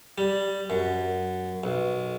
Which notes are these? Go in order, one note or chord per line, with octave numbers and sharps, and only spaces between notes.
G3
F#2
B1